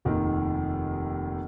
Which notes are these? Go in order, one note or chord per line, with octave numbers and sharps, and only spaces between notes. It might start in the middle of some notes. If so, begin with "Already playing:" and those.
F1 D#2 D#3